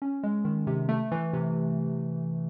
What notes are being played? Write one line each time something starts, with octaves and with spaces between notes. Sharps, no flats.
C#4
G#3
D#3
C3
A3
E3
C3